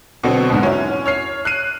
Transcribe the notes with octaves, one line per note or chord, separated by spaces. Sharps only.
B2 D3 F#3 B3 C4
G1 G#2 F#4
C#4 E4
C#5 F6 C7
F#6 C7 D#7